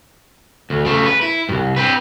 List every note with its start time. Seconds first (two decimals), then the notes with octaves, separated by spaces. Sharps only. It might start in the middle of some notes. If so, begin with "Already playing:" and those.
0.70 D2
0.85 C#3 A3
1.06 B4
1.21 E4
1.49 C2 G2
1.77 C4 B4